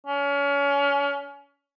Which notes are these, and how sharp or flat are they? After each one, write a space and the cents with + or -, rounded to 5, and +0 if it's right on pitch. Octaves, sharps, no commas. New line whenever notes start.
C#4 +30